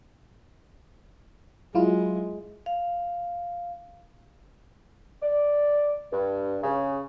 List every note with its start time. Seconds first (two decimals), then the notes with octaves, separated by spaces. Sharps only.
1.75 F#3 G#3 E4 F4
2.66 F5
5.22 D5
6.13 G2
6.63 C#3